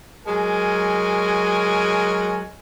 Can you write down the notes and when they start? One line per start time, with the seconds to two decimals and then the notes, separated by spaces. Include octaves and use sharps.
0.26 F#3 G#3 A#4 G#5